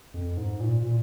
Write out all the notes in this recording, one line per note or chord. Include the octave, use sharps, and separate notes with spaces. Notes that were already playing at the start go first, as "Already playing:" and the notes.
F2
G#2
A#2
A#2